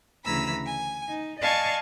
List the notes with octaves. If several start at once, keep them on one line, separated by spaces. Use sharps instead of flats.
D2 C#3 E3 A#5 B5 E6
G#5
D#4
D5 D#5 F5 G#5 A5 C#6